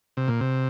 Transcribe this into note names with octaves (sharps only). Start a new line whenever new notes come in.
C3
A#2
C3